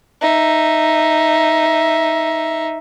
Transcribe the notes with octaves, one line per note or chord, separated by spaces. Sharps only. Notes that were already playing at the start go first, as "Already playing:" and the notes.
D#4 E5